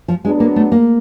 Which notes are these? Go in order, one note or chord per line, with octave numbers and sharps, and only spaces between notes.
F3
F#3 G#3 B3 D4
A#3
A3
A#3